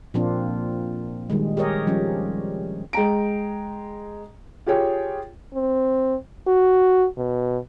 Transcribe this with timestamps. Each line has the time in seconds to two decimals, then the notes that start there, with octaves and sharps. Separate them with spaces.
0.14 A#2 F3 A#3 C4 D4 F4
1.30 D#3 G3 G#3
1.57 G4 G#4 A#4 C#5 D#5
1.87 F3 G3 C#4
2.93 G#3 G5 A#5 D7
4.66 F4 G4 G#4 C#5 G5
5.54 C4
6.47 F#4
7.17 B2